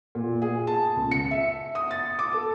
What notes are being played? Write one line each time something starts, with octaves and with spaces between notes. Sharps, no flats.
A#2
G#4
A5
C#2
C#7
E5
D#6
A6
D6
A4